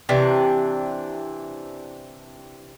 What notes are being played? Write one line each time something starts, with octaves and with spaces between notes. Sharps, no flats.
C3 E3 D4